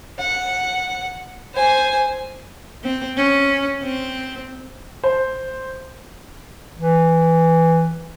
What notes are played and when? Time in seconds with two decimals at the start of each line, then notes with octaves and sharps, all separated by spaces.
0.19 F#5
1.54 C5 G#5
2.84 C4
3.17 C#4
3.83 C4
5.04 C5
6.77 E3